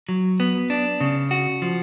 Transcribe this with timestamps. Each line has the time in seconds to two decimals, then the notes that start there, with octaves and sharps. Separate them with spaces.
0.09 F#3
0.40 B3
0.70 D4
1.01 C#3
1.31 F#4
1.62 F3